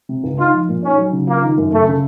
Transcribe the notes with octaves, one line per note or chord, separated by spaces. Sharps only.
C3
C#2
D#4 F4
F3
A#2
C#4 D#4
F#3
C#3
A#3 F4
D#3
F#2
C#2 A3
C#3